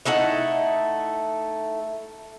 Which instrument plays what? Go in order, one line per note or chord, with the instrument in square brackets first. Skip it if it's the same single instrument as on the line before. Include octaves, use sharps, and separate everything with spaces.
[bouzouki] A3 D#4 E4 F#5